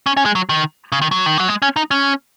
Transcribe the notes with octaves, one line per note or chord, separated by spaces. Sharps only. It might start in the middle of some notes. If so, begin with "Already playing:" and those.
C#4
C#4
G#3
F#3
D#3
C#3
D#3
F#3
D#3
F#3
G#3
C#4
D#4
C#4